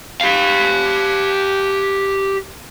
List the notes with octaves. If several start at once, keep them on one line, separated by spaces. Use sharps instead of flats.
G4 F5